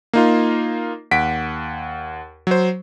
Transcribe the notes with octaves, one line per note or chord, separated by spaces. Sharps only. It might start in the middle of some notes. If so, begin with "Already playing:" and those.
A#3 D#4 F4
D#2 F#5 B6 D7
F#3 C5